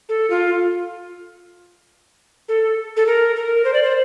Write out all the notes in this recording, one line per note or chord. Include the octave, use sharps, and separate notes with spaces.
A4
F4
A4
A4
A#4
A#4
C5
D5
C5